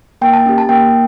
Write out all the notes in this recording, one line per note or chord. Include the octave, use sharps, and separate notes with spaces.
A#3 G5
A5
C#4 G4
A5
A#3 G5